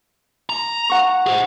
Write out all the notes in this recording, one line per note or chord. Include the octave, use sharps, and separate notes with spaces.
A#5
F#5 C#6
G#4 C5